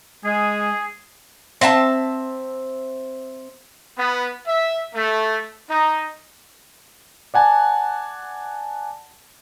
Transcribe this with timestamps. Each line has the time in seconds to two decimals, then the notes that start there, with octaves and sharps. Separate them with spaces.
0.25 G#3 G#4
1.61 C4 E5 F#5 A5
3.98 B3
4.47 E5
4.95 A3
5.69 D#4
7.34 D5 F#5 G#5 A5